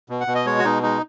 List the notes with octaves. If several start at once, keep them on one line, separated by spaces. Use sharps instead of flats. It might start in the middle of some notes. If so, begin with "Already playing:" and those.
B2
F#5
B2
D#5
G#3 C#5
F#4
B2 D#4
G#3 D#4